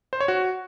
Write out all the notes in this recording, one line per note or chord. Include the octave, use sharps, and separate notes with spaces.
C5
C#5
F#4